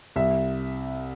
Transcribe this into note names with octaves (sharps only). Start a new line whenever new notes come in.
C2 E5